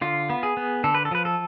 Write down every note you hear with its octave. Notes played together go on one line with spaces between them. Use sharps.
D3 F4
B3
G#4
B3
D3 A4
B4
A4
F3 B4
A4